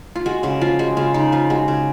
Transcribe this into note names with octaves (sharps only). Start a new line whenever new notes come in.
F4
G#3 F#4
C#3 F#4
F3 F4
G#3 F#4
C#3 F4
C#3 D#4
F3 F4
G#3 F#4
C#3